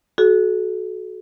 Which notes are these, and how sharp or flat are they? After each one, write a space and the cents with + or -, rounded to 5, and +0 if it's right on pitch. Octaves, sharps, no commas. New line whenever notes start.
F#4 +0 A4 -35